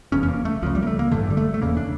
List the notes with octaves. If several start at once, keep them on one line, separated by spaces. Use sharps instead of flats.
F1 E2 C#3 C#4
C#4
A#3
A3
C#2 C#3 F3
G3
A#3
A3
A#3
A1 G2 D3 A3
G3
A3
A3
E1 E2 C#3 A#3
D4